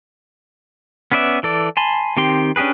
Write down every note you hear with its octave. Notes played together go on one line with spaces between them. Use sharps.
B3 C#4 B4 D5 E5
E3 A4 D5
G#5 A5 B5 C6
D#3 C4 G4 G5 C6
C#4 D4 G4 G#4 B4